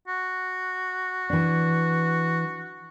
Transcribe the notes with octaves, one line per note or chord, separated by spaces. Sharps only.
F#4
E3 D4